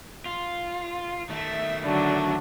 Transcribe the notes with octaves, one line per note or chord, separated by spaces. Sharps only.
F4
D#3 A3 E5
D3 F#3 D4